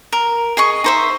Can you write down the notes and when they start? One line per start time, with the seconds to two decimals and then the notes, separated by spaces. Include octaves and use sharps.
0.13 A#4
0.57 G#4 D#5 C#6
0.84 D#4 C5 E5